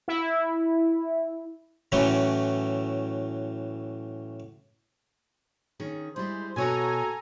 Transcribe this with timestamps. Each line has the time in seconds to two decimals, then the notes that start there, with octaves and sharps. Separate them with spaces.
0.08 E4
1.92 A2 E3 F#3 A3 C#4
5.80 D#3 C#4 G#4
6.16 G3 G#3 E4 G#4 C5
6.56 B2 F#4 A4 C#5 F#5 G#5 A#5